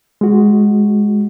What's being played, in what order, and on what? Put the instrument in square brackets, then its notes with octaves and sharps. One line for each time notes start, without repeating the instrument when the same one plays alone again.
[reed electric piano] G#3 F#4